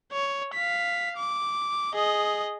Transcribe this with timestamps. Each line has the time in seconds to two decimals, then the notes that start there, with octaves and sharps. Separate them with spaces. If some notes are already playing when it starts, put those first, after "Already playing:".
0.13 C#5
0.54 F5 B6
1.17 D6
1.94 G#4 D#5